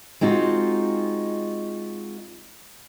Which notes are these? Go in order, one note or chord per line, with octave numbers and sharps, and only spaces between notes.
G#3 C4 D#4 F4 F#4